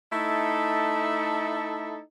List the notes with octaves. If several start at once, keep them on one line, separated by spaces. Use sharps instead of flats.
A3 D#4 E4 A4